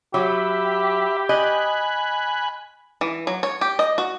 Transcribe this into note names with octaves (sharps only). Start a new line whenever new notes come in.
F#3 G4 E5 B5
D#5 G#5 B5 F#6
E3
F#3
C#5
G4
D#5
F#4